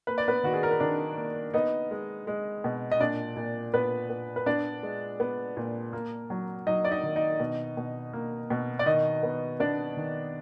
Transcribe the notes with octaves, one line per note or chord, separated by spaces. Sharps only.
A#3 B4
D5
B3 B4
D#3 F#4
G#4
A#4
B4
D#3 D4 D5
A#3
B3 D#4 D#5
G#3
G#3
B2
D#5
A#2 D4 D5
A#2
A#2 B3 B4
B3
B4
B3 D4 D5
G#3
B3
A#2
A#3
F#3
F#3 D#4 D#5
D5
D#4 D#5
D#3
D#4 D#5
B2
B2
A#3
B2
D5
D#3 D#4 D#5
B3
B3 D4 D5
D#3